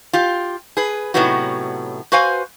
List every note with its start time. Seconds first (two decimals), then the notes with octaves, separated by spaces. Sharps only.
0.13 F4 G4
0.77 G#4 B4
1.14 A2 C3 F#3 B3 D#4 F#4
2.12 F#4 B4 C5 F5 G#5